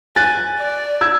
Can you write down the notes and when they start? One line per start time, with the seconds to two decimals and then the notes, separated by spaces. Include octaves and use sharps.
0.16 G#5 F#6 A6
0.59 D5
1.01 E6 G#6